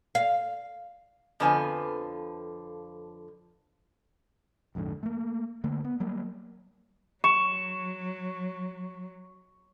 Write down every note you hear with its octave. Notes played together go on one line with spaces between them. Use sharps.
F5
F2 D3 F3 B3 B4 G#5
A#1 F2 G#2 D3
A3 A#3
D3 A3 A#3
B3
F#3 G3 A#3
F#3 C#6 E7